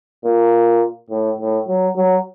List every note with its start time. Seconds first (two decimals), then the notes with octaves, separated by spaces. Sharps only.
0.25 A#2
1.11 A2
1.39 A2
1.68 F#3
1.96 F#3